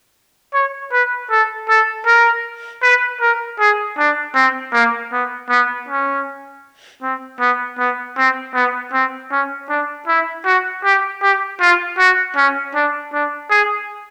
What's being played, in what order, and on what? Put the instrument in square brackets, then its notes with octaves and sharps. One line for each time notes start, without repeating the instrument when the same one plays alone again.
[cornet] C#5
B4
A4
A4
A#4
B4
A#4
G#4
D4
C4
A#3
B3
B3
C#4
C4
B3
B3
C4
B3
C4
C#4
D4
E4
F#4
G4
G4
F4
F#4
C#4
D4
D4
G#4